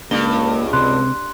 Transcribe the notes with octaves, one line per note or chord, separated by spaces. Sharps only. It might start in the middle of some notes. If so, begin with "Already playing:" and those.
C#2 G2 A#3 G7
C3 C4 C6 F#6